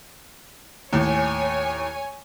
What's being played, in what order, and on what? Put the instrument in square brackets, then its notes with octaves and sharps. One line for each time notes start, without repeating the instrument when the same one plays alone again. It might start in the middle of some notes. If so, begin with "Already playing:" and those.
[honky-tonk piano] D#2 [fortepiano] A2 [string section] C#5 G#5